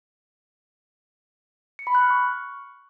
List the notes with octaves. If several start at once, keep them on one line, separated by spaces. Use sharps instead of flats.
C#7
B5
F#6
F6
C#6